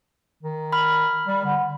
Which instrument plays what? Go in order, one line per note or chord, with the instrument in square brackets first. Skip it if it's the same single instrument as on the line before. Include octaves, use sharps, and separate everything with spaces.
[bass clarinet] D#3
[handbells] B5 F6
[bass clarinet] G3
D3